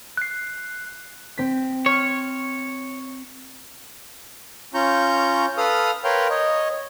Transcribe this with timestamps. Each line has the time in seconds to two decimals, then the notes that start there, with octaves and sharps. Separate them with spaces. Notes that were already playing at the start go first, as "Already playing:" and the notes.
0.17 F#6 C7
1.38 C4 B6
1.86 C#5 C6 F6
4.74 C#4 F4 A#5 C#6 G6
5.58 A4 B4 F5 D#6 F6
6.04 A#4 B4 C#5 F5 G5 C6
6.30 C#5 D#5